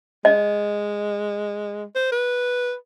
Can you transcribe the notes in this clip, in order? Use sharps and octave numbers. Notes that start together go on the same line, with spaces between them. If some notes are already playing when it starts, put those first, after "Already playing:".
G#3 D#5
C5
B4